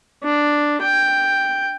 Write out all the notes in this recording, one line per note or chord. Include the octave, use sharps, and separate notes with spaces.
D4
G5